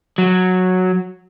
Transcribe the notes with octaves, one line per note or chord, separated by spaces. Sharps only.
F#3